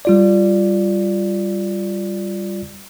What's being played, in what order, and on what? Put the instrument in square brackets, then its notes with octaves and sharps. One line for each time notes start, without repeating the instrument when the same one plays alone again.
[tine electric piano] G3 F4 D5